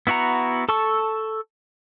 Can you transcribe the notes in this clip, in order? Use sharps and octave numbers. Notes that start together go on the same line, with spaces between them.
B3 E4 F#4 F#5 A#5
A4 A5 C#6 E6